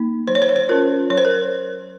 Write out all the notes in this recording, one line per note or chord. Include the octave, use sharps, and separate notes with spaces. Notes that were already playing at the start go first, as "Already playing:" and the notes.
Already playing: A#3 D#4
F#3 C5
C#5
C5
C#5
C5
C#4 F4 A#4
F#3 C#5
C5
A#4